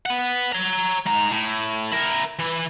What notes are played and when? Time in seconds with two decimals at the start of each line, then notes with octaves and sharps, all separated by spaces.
0.06 B4 F#5
0.52 C#5 A#5
1.06 G#2 A#5
1.31 A2
1.92 E4 A#4
2.39 E3 B4